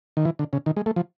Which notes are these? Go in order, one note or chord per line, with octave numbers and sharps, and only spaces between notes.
D#3
E3
D3
C#3
D#3
G#3
A3
F3